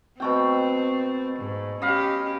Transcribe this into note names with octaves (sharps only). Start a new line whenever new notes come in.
B2 A3 C4 G5
G#2
C#4 G4 D#5 F5 B5